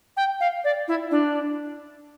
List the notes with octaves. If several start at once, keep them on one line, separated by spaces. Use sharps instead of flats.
G5
F5
D5
E4
D4